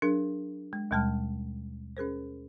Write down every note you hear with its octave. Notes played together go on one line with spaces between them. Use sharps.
F#3 D4 G#4 A#4
G#3
D#2 B2 G3 G#3 A5 F6
C#4 G#4 A#4 C5